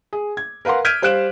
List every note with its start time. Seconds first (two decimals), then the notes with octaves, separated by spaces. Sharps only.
0.13 G#4
0.37 G#6
0.65 A#4 B4 F5 F#5 C6
0.85 F6 G6 G#6 B6 D7 D#7
1.02 G3 C5 F5 F#6 D7 E7